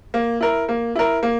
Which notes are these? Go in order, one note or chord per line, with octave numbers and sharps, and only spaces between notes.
A#3
E4 A#4
A#3
E4 A#4
A#3